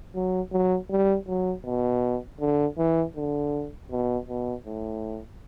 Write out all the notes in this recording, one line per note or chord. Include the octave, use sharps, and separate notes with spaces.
F#3
F#3
G3
F#3
B2
D3
E3
D3
B2
B2
A2